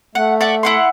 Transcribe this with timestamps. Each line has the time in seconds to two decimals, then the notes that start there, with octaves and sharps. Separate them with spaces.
0.15 A3 F#5
0.41 D5 E5 F#5
0.63 E4 F#5 C6